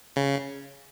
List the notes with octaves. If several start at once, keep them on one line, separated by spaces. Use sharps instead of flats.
C#3